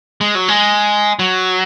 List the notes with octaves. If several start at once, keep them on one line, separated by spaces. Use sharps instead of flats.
G#3
F#3
G#3
F#3